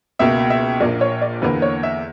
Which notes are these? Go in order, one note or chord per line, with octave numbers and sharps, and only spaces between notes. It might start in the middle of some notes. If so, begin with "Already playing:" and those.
C#2 B2 A#3 E5
E5
A#1 A#2 A#3 D5
C#5
D5
E2 D3 A#3 B4
C#5
E5